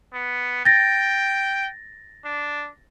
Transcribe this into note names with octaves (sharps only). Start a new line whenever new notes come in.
B3
G5 A6 A#6
D4